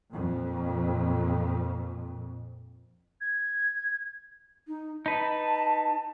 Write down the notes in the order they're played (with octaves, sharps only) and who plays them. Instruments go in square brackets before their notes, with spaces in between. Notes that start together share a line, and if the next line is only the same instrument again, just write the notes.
[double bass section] F2 A#2
[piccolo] G#6
[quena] D#4
[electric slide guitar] D#4 B4 [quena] A5